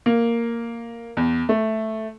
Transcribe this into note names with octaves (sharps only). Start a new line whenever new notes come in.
A#3
E2
A3